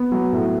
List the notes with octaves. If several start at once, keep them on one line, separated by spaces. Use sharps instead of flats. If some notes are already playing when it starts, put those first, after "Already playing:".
Already playing: B3
F#3
A2